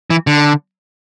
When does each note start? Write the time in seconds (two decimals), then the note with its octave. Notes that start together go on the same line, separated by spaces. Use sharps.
0.10 E3
0.27 D3